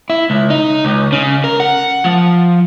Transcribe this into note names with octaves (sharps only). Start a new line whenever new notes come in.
E4
C#2
D#4
C#2
C#3
A#4
F#5
F3